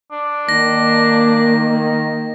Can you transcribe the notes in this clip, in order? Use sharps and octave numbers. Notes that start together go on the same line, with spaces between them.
D4
D#3 A#3 A#6